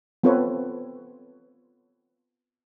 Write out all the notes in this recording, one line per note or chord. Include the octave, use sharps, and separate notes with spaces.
B3 C4 F4 A4 B4 C#5